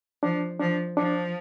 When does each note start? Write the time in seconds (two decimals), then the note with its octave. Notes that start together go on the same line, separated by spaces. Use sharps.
0.23 F3 D4
0.60 F3 D4
0.97 F3 D4